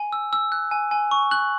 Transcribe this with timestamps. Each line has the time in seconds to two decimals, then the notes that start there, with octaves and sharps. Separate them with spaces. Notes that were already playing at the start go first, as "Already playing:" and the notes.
Already playing: G#5
0.13 E6
0.33 E6
0.52 F#6
0.71 G#5
0.91 G#5
1.11 C#6
1.31 F#6 F#7